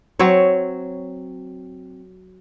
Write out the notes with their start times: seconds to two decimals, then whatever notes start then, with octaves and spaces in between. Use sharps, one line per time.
0.19 F#3 C4 C#5